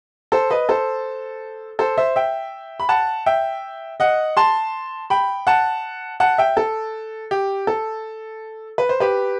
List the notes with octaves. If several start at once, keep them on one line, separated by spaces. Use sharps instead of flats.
A4 C5
B4 D#5
A4 C5
A4 C5
C5 E5
E5 G5
B5
F#5 A5
E5 G5
D#5 F#5
A5 C6
G5 B5
F#5 A5
F#5 A5
E5 G5
A4
G4
A4
B4
C5
G4 B4